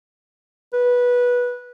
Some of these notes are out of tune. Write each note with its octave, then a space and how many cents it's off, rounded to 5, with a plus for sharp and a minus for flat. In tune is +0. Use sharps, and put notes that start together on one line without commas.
B4 -15